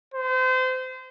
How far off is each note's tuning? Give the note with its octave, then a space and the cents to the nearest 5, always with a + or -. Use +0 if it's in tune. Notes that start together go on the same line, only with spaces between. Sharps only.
C5 -30